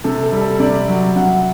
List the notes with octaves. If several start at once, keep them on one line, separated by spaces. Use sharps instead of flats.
C3 A4
A4
G3
A4
C3 D5
F#3
C3 F#5